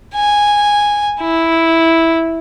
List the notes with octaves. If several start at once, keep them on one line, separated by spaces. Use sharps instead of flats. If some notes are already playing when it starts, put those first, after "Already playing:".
G#5
E4